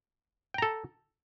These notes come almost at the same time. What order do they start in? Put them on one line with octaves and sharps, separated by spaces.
G5 A#5 A4